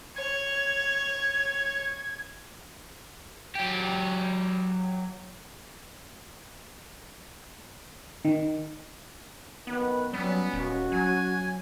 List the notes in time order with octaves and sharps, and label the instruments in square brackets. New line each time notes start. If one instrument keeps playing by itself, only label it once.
[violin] C#5 [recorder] G#6
[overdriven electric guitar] F#3 G4
[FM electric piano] D#3
[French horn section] F#2 D#3 [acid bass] B3 [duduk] B4
[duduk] F#3 [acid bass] G3 [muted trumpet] B3 [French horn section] C#4
[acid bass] D#1 [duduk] F#4
[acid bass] F#3 [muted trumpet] G#5